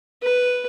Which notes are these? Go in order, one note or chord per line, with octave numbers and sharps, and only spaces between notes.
B4